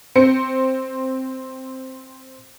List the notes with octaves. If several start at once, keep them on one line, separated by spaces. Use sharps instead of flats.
C4 C5 C#7